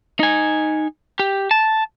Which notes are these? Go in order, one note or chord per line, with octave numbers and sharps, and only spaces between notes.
D#4 G#5
G4
A5